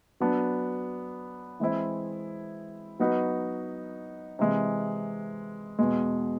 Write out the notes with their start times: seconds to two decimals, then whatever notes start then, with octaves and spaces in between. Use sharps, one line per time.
0.20 F#3 B3 D4
1.60 E3 G#3 C4 E4
3.00 F#3 B3 D#4 F#4 B4
4.39 C3 E3 G#3
5.79 E2 B2 G#3